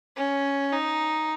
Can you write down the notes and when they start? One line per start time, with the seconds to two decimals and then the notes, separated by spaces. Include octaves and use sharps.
0.17 C#4
0.73 D#4